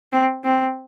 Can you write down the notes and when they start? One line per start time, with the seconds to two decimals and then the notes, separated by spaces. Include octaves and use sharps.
0.12 C4
0.44 C4